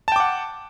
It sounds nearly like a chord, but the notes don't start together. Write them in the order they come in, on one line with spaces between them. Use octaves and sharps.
A5 G5 D6 F#5